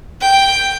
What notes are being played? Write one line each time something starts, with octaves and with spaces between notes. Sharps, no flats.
G5